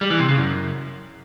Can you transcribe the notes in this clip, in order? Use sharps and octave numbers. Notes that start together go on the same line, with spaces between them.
G3
E3
C3
C#3
F#2